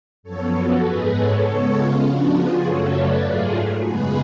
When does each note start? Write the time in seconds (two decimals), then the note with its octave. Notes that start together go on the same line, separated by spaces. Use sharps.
0.23 F#2 F3 B3 A4 C#5
0.53 F#4 A4
0.83 G#2 G#3 B3 G#4 B4
1.13 A4 C#5
1.43 C#3 G#3 B3 A4 C#5
1.73 C#4 F4
2.04 C#3 F3 B3 D4 F#4
2.34 F4 G#4
2.64 F#2 C#3 F#3 A3 A4 C#5
2.93 B4 D5
3.24 G#2 F#3 A3 F4 G#4
3.84 F#2 C#3 G#3 B3 G#4 B4